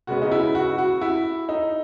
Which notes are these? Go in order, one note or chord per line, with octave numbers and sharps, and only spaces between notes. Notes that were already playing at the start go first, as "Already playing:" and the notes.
C#3 G#3 B3 F#4
D#4
E4
F#4
F#4
E4
D#4